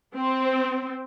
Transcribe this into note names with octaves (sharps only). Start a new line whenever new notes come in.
C4